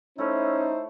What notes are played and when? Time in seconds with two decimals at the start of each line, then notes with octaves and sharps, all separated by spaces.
0.18 A3 C#4 D#4 E4 C5 C#5